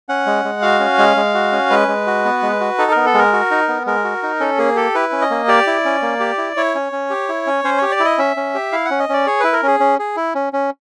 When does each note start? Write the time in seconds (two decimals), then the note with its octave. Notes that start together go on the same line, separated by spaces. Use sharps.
0.09 C#4 F#5
0.26 G#3
0.45 G#3
0.62 F#4 F5
0.80 C#4
0.98 G#3
1.17 G#3
1.35 F#4
1.52 C#4
1.70 G#3 B4
1.88 G#3
2.07 F#4
2.25 B3
2.42 G#3
2.61 F#4
2.78 D#4 A4
2.91 B3 A#4
3.06 A4
3.14 G#3 A#4
3.33 F#4
3.51 D#4
3.68 B3
3.86 G#3 A#4
4.04 F#4
4.23 D#4
4.40 C#4 A4
4.58 A#3 G#4
4.76 G4 A4
4.95 E4 B4
5.12 C#4
5.21 D#5
5.30 A#3
5.48 G4 D5
5.67 E4
5.85 C#4
6.02 A#3
6.20 G4
6.38 E4
6.57 E4 C#5
6.75 C#4
6.92 C#4
7.10 G4
7.29 E4
7.47 C#4
7.64 C#4 C5
7.78 G4 C#5
7.92 D5
8.00 E4
8.05 D#5
8.18 C#4 E5
8.37 C#4
8.54 G4
8.72 E4 F5
8.85 F#5
8.91 C#4
8.99 D#5
9.09 C#4 D5
9.27 G#4 C#5
9.40 E4 B4
9.53 A#4
9.63 C#4 G#4
9.80 C#4
9.99 G#4
10.16 E4
10.35 C#4
10.53 C#4